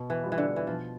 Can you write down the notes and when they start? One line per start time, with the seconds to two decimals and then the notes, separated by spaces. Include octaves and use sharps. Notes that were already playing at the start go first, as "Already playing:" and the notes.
Already playing: B2
0.10 E3
0.23 G3 B3 F4
0.32 E3
0.38 D3
0.56 E3
0.67 B2 F3